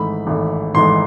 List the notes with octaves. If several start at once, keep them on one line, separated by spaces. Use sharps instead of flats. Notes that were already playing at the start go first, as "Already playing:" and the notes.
Already playing: G#1 G#2 E3 A3 B5
G#1 G#2 E3 A3
G#1 G#2 E3 A3 C6